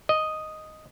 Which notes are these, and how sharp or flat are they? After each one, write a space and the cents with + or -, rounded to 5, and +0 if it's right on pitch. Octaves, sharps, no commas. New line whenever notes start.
D#5 +0